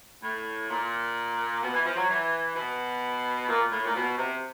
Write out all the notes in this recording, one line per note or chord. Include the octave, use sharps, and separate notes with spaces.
A2
A#2
B2
E3
F3
F#3
E3
B2
A#2
A2
A#2
B2
C3